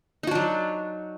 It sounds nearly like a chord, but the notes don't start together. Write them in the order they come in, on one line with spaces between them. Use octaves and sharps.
D#4 F#4 D4 F#3